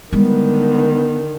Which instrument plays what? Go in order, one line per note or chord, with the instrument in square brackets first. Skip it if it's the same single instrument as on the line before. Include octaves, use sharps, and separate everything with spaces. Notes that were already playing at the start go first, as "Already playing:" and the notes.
[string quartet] D3 D#3 [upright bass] G3 G#3 [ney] B3